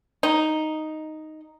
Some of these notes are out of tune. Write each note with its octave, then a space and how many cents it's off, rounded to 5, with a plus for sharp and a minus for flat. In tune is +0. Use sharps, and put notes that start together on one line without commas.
D#4 +0